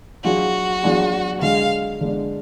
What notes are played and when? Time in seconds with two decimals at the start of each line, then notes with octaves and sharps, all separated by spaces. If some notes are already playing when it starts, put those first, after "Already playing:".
0.24 F#3 D4 F4 F#4 G#4
0.83 F#3 D4 F4 G#4
1.42 D3 G#3 D4 F5
2.01 D3 G#3 D4